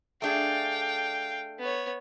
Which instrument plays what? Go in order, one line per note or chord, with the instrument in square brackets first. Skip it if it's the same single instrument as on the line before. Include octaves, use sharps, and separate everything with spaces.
[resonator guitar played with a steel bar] A3 D4 G#4 [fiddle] F5 G5
[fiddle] B3 C#5